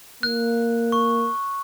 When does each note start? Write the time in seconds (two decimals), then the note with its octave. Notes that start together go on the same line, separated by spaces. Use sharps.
0.23 A#3 F#6
0.92 C#6